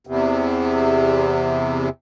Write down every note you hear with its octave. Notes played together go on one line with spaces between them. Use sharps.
E2 C3